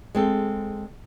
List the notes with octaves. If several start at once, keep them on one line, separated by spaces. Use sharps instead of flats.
G#3 C4 A4